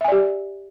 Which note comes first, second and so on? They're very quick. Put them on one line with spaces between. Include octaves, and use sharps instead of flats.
E5 G#5 D5 G4